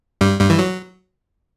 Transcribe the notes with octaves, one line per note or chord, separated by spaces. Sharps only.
G2 G3
G2 G3
E3
F#3